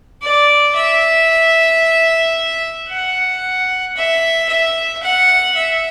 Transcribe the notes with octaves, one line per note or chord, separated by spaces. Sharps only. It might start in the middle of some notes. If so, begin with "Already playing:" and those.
D5
E5
F#5
E5
E5
F#5
E5